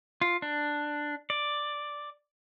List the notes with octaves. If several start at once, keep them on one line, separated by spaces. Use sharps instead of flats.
F4
D4
D5